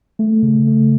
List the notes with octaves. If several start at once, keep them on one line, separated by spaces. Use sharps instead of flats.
A3
C#3
A3